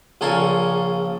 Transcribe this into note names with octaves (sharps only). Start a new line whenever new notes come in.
A#1 C#3 A4 A#4 G#5 C6